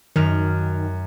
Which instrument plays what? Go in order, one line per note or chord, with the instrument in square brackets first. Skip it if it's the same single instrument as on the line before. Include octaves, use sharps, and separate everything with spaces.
[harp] F#2 F6 [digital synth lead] D#3